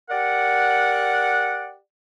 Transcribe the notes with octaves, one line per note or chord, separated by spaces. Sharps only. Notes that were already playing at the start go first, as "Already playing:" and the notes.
G4 A#4 D5 F#5